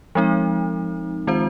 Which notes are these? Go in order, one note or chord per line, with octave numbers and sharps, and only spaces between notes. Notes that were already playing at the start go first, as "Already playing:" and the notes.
F3 G#3 C4 D#4
D#3 G#3 C4 F4 C5